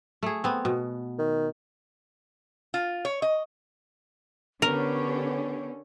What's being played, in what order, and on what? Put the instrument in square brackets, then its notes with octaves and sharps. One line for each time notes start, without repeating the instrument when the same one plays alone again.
[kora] A3 G#4
B3 C4
B2
[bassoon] D#3
[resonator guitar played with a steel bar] F4
C#5
D#5
[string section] D3 C#4 [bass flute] B3 [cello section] D4 G4 C#5 [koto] A#4